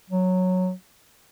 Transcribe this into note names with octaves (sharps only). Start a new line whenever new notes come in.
F#3